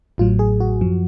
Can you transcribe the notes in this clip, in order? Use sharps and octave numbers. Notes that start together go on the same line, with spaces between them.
A1 A2 F#3 F4
G#4
F#4
F#2 F3